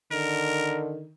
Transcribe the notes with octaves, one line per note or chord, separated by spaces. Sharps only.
D3 D#3 A#4